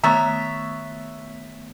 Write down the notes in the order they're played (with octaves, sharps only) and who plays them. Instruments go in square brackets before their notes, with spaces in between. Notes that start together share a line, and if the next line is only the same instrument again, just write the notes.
[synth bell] D#3 A3 B3 [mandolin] C#5 E5 [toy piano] A#5